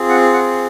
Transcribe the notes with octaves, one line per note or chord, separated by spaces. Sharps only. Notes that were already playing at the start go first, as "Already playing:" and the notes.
Already playing: C4 F4 G#4
F#5
F#5